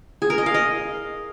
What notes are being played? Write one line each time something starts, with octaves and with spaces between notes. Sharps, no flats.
G#4
A#4
D#5
F5
D#5